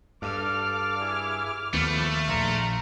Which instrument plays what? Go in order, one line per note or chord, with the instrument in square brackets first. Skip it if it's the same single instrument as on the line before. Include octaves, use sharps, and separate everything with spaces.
[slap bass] G2 [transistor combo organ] A4 D5 F5 [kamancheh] D6 F6
[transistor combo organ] E4 G#4
[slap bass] D#2 D#3 [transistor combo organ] F3 B3 [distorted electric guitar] A3
[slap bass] A#1 [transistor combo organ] F5 C6 [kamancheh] A#5